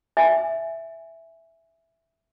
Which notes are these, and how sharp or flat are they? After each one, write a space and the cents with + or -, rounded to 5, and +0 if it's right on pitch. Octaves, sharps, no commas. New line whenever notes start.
E5 +0 G#5 -5